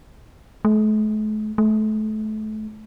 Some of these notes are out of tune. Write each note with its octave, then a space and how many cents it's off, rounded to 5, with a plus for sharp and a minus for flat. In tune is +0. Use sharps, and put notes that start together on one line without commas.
A3 -45
A3 -30